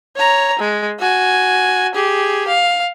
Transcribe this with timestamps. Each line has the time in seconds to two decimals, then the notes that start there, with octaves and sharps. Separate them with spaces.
0.16 C#5 A#5
0.59 G#3
0.99 F#4 G#5
1.95 G4 G#4
2.48 F5